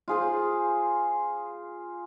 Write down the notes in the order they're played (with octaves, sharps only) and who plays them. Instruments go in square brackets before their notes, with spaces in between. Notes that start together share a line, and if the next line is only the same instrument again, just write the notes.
[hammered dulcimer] F4 G#4 C5